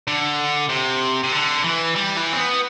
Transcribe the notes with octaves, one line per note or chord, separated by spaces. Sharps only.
D3
C3
C3
D3
E3
G3
E3
C4
B3